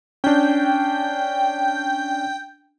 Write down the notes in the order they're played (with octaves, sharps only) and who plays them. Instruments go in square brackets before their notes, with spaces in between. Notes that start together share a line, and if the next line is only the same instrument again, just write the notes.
[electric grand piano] C#4 D4 [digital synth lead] G5